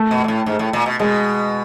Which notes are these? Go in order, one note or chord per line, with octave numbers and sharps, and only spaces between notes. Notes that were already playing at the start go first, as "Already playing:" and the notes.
Already playing: A3
B2
A#2
A2
G#2
A2
A#2
B2
B2 G#3